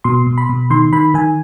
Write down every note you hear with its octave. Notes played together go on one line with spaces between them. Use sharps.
B2 C6
B2
B5
B2
D#3 C6
D#3 B5
D#3 G#5